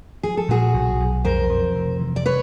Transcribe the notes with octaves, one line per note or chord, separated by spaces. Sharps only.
F3 G#4
A4
A#2 F#4 G#4
B1
B1
F2 A#4 C5
F2
C3
E3
D5
B4 C#5